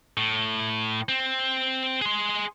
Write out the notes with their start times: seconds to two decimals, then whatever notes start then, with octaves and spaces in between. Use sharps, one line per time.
0.17 A2
1.09 C4
2.02 G#4 C6